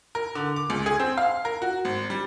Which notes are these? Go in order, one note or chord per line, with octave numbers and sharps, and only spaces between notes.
A#4
D3
D6
C#2
G#4
C4
F5
A#4
F#4
G#1
G3